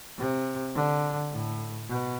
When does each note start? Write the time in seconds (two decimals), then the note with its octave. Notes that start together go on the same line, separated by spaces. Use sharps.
0.18 C3
0.75 D3
1.32 A2
1.89 B2